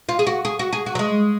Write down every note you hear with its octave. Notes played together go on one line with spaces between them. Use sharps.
F4
G#4
F#4
G#4
F#4
G#4
F#4
F#3
G#3